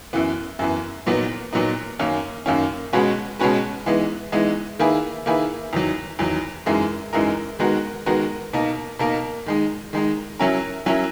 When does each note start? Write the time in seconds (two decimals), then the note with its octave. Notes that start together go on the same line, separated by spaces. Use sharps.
0.13 F#2 E3 B3
0.59 F#2 E3 B3
1.07 A#2 F#3 B3 D#4
1.53 A#2 F#3 B3 D#4
1.99 F#2 D#3 A#3 C#4
2.46 F#2 D#3 A#3 C#4
2.93 B2 G#3 C#4 F#4 B4
3.39 B2 G#3 C#4 F#4 B4
3.86 E3 G#3 B3 D#4
4.32 E3 G#3 B3 D#4
4.79 D#3 A#3 E4 G#4 B4
5.26 D#3 A#3 E4 G#4 B4
5.73 E2 D#3 F#3
6.19 E2 D#3 F#3
6.66 F#2 E3 G#3 D#4 A#4
7.13 F#2 E3 G#3 D#4 A#4
7.59 D#3 G#3 B3 F#4 A#4
8.06 D#3 G#3 B3 F#4 A#4
8.53 B2 A#3 D#4 A#4
8.99 B2 A#3 D#4 A#4
9.46 D#3 G#3 D#4
9.93 D#3 G#3 D#4
10.39 F#3 C#4 E4 A#4
10.86 F#3 C#4 E4 A#4